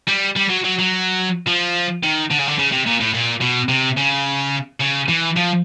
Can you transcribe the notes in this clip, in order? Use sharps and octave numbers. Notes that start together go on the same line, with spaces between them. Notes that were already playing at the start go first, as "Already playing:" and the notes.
G3
G3
F#3
F#3
F#3
F3
D#3
D3
C#3
D3
C#3
C3
A#2
A2
A#2
B2
C3
C#3
C#3
E3
F3